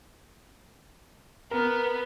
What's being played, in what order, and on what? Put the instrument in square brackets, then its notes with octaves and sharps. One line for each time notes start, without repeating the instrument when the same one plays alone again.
[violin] B3 [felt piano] A#4